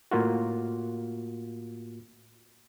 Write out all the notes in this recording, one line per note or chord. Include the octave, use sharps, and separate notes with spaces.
A2 A#3 F4 F#4